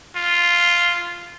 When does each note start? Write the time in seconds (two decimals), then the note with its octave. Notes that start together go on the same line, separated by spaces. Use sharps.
0.16 F4